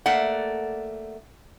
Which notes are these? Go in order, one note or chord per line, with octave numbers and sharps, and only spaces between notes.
A3 A#3 D5 F#5